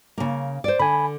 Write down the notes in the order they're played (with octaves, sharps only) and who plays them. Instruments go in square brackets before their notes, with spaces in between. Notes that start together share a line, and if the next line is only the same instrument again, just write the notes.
[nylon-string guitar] C#3 A#3
C5 D5
[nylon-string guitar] D3 [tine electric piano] G#5 B5